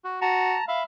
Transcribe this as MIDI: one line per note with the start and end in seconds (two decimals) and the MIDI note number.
0.05 0.20 66
0.22 0.55 66
0.22 0.65 81
0.22 0.65 82
0.68 0.83 76
0.68 0.81 77
0.68 0.83 83